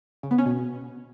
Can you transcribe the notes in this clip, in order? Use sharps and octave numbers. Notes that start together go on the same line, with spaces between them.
C#3
B3
C#4
B2